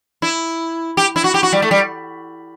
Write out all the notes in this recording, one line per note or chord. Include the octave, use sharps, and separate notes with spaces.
E4
G4
E4
F#4
G4
F#4
G3
A3
G3